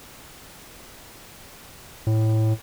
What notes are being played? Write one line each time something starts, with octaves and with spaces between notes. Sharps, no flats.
A2